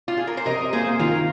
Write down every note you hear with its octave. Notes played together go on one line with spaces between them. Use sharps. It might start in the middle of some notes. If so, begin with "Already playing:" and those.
F4
G#4
A#4
C5
C3 A#4 D#5
A#3 G#4 C5
D#3 F4 A#4